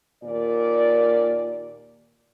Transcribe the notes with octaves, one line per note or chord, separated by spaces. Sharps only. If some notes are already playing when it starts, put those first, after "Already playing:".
D#2 A#2 A#4 D5